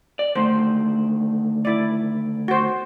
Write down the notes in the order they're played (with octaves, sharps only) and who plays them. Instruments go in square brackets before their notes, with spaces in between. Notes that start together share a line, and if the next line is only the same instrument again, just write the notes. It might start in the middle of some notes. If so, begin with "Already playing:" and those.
[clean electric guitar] D5
[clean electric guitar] D3 D#3 A3 [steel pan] C5
[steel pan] E4 D5
F#4 C5